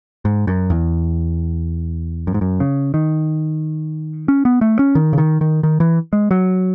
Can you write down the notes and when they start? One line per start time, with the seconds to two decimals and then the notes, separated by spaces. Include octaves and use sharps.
0.25 G#2
0.47 F#2
0.70 E2
2.27 F#2
2.34 G#2
2.41 F#2
2.60 C#3
2.94 D#3
4.28 C#4
4.45 B3
4.61 A3
4.79 C#4
4.95 D#3
5.13 C#3
5.18 D#3
5.41 D#3
5.63 D#3
5.80 E3
6.13 G#3
6.31 F#3